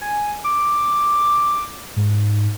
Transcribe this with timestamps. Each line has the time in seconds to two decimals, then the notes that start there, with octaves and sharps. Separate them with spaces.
0.01 G#5
0.44 D6
1.96 G#2